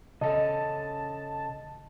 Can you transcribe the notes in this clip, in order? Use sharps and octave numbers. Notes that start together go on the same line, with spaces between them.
C#3 A4 D#5 A5